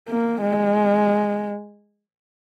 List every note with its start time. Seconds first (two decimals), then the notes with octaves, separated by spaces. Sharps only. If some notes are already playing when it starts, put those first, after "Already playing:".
0.09 A#3
0.42 G#3